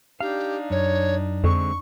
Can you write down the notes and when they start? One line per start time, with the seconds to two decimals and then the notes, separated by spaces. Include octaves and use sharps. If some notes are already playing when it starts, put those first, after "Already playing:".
0.20 D4 D#4 G4 F5
0.70 F#2 C#5
1.44 F2 D3 G#3 C4 C#6